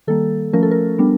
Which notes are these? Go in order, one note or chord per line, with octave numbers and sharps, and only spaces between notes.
D#3 G3 A#3 A4
F3 A3 C#4 A#4
A4
A#4
G3 B3 D4